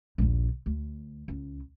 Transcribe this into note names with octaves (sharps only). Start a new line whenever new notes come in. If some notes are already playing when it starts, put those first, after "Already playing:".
A#1 D#2
D2
C#2